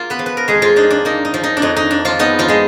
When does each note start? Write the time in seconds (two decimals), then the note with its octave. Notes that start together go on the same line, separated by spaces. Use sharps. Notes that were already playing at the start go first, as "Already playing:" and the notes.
Already playing: A#3 F4
0.10 B3 B4
0.19 F3
0.26 B4
0.37 A#4
0.48 F2 G#3 G#4
0.62 F3 F4
0.76 D4 D#4
0.90 D4
1.05 A#3 D#4
1.25 D#4
1.34 F3
1.43 D#4
1.57 D4
1.62 F2 D#4
1.77 D#4
1.91 D4
2.05 F3 F4
2.19 B3 D#4
2.39 F3 F4
2.48 G#3 D#4